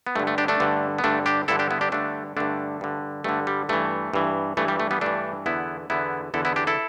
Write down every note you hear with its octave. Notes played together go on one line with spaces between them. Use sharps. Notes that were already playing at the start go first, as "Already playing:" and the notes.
B3
G2 D3 A3
A3
D4 G4
A3 D4
G2 D3
B3
G2 D3 A3 D4
D4 G4
G2 D3 E4 A4
D4 G4
B3 E4
D4 G4
G2 D3 A3 D4
G2 D3 A3 D4
G2 D3
G2 D3 A3
G3
G2 E3 A3
G2 E3
G2 E3 A3
G3
A3
G3 B3
G2 E3 A3 D4
E2 D3 B3 E4
E2 D3 B3 E4
E2 D3 E4 A4
B3 E4
D4 G4
E4 A4